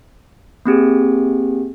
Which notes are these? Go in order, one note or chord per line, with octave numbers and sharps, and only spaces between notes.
A#3 C4 G4 G#4